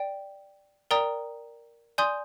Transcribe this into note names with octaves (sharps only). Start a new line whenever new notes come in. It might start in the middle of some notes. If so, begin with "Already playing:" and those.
Already playing: D5 G5
A#4 D5 G5 A#5 D#6
D5 G#5 C6 D#6 G6